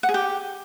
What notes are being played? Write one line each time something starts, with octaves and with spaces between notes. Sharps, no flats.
F#5
G#4
G4